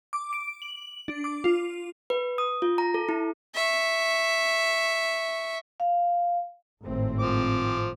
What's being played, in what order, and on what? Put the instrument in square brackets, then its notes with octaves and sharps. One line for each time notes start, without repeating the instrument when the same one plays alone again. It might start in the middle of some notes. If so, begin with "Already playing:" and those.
[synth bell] D6
D7
F#7
D4
D6
F4
[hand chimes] B4
D#6
F4
A#5
A4
E4
[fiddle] E5 C#6
[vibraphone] F5
[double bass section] G#1 A2 C4
[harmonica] F3 D6